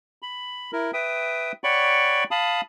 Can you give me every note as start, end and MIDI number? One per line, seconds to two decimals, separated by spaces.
0.22 0.71 83
0.73 0.91 64
0.73 0.91 70
0.93 1.52 71
0.93 1.52 76
0.93 1.52 79
0.93 1.52 87
1.64 2.24 73
1.64 2.24 74
1.64 2.24 78
1.64 2.24 79
1.64 2.24 83
1.64 2.24 85
2.31 2.61 77
2.31 2.61 81
2.31 2.61 83
2.31 2.61 87